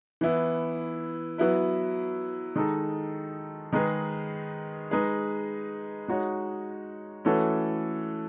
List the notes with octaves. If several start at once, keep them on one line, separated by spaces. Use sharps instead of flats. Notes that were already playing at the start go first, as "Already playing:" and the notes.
E3 B3 E4
F#3 B3 E4 B4
D#3 G#3 D#4 A4
D#3 G#3 D#4 G#4 B4
G#3 D#4 G#4 B4
G#3 D#4 F#4 C#5
E3 A3 C#4 F#4 A4